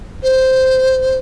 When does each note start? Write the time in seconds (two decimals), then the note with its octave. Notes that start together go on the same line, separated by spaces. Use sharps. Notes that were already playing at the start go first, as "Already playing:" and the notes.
0.23 C5